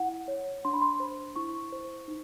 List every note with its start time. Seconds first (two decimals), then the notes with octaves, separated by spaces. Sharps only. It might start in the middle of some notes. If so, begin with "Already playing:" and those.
Already playing: E4 F#5
0.28 C#5
0.65 D4 C6
0.73 B5
0.82 C6
1.00 C5
1.36 E4 C#6
1.72 C5
2.08 D#4